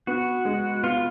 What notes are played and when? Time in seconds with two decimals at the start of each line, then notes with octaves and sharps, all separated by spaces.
0.07 B3 F#4
0.45 G#3
0.83 B3 F4